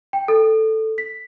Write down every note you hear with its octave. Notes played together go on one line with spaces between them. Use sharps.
G5
A4
B6